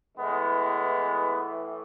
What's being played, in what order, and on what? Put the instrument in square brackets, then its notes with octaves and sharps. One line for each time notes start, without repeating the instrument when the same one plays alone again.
[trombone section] A2 E3 G#3 B3